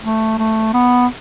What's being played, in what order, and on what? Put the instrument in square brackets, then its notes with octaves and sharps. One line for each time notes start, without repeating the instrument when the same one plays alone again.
[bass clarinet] A3
A3
B3